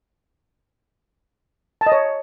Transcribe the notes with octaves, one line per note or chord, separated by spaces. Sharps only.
A5
D#5
C#5